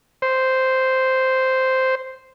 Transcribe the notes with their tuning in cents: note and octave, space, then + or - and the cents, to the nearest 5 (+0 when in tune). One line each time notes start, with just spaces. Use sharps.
C5 -5